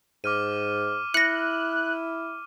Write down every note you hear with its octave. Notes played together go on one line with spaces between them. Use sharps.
G#2 D6 F6 D#7
E4 F#6 A#6 C#7